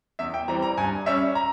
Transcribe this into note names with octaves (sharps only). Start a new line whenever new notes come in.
E2 E5
G5
E3 G3 C4 A#5
A#5
G2 G#5
G3 C#4 E5
A#5